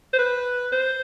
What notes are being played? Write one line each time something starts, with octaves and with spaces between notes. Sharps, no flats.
C5
B4
C5